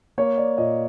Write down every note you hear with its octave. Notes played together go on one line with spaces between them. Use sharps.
A#3 C#5
D5
A#2 D#5